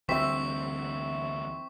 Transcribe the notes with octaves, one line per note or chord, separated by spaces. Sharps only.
D2 E3 G3 C4 E5 C#6 B6